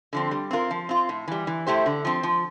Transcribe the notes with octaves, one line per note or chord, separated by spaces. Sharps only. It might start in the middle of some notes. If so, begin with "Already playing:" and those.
D3 F3 C4
G3
C4 F4 A#4
F3
C4 F4
A2
E3 G3
E3
A3 E4 G4 C5
D3
F3 C4
F3